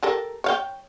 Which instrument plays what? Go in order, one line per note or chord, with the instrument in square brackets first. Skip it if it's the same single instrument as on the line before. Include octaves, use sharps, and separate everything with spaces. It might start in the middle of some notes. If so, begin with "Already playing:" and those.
[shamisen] G4 A4 A#4
C#5 F5 G5